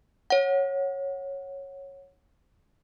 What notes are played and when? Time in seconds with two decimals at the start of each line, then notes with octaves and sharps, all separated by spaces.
0.30 C#5 F#5